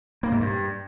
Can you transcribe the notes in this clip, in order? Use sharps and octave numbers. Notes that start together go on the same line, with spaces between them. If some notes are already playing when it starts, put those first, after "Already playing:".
A#3
G#2
G2